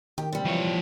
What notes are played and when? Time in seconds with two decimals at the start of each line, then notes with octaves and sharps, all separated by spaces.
0.18 D#3 G4
0.33 C3 G3
0.46 E3 F3 C#5